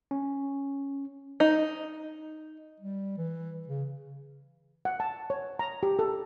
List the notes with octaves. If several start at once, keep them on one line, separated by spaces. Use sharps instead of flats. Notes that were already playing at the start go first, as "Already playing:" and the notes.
C#4
D#4
G3
E3
C#3
F#5
A5
C#5
A#5
G4
A4